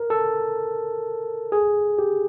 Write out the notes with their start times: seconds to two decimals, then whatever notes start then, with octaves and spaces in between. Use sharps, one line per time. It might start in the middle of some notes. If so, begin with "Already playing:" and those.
Already playing: A#4
0.10 A4
1.52 G#4
1.99 G4